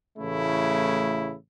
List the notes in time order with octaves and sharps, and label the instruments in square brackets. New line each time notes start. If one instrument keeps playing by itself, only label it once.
[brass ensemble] A1 C#3 A3 E4